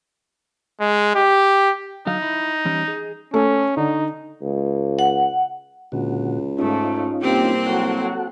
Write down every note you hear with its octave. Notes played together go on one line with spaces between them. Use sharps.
G#3
G4
D3 F#3 D#4 F5
E4
E3 G3 C#4
G#4
A3 C#4
D3 D#4
C#2
F#5
C#2 A#2 D3 F#4
G#2 A3 C#4 D#4 F4
C2 A#3 C4 G4
F#3 F#4 A4 F#5